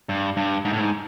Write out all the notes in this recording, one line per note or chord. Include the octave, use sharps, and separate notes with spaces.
G2
G2
G#2
A2
G#2